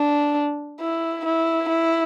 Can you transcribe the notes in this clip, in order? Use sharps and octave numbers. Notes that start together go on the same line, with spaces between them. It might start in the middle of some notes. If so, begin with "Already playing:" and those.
Already playing: D4
E4
E4
E4